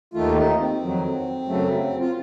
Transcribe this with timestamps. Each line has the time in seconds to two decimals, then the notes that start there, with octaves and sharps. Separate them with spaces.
0.14 D#2 D#3 A3 F4
0.35 D#4
0.58 C4
0.80 F2 D#3 F#3
1.45 F#2 C#3 F#3 A3
2.00 F4